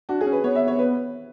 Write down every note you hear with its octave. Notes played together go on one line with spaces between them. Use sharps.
D4 F#4
G#4
C#4
B4
B3 C#5
E5
C#5
B4